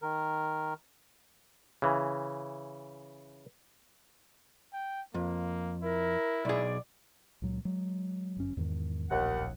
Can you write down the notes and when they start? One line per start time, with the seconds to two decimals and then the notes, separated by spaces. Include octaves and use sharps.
0.02 D#3 A#4
1.82 C#3 E3
4.73 G5
5.14 F2 A#3
5.83 E4 A#4
6.45 B1 G#4 D5
7.42 C#2 A#2 F#3
7.65 F#3 G#3
8.37 G1 F#2 C#4
8.57 E2 G#2 D#3
9.10 D1 A#1 D#2 F#5